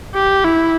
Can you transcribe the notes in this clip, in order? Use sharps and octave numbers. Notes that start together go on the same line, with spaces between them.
G4
E4